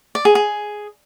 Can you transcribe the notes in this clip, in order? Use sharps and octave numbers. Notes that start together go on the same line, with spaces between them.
D5
G#4
G#4